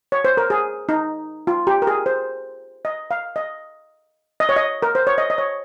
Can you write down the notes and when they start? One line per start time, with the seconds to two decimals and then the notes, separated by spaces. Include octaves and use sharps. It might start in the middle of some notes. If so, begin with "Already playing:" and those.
0.12 C#5
0.25 C5
0.37 A#4
0.50 G#4
0.89 D#4
1.47 F4
1.67 G4
1.82 A#4
1.87 G#4
2.06 C5
2.85 D#5
3.11 F5
3.36 D#5
4.40 D#5
4.49 C#5
4.56 D#5
4.82 A#4
4.95 C5
5.07 C#5
5.18 D#5
5.30 D#5
5.38 C#5